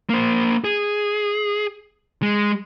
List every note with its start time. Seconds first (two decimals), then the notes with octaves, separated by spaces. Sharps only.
0.10 A#3 C5
0.64 G#4
2.22 G#3